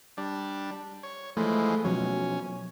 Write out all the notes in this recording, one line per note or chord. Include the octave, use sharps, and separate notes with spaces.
G3 D4
C#5
E3 F3 G#3 A3
B2 F3 F#3 C#4